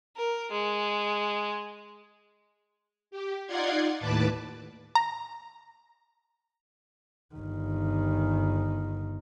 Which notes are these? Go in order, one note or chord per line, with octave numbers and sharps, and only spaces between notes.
A#4
G#3
G4
D#4 F4 D5 F#5 C6 G#6
D#2 A2 B4 A5 D6
A#5
G1 D#3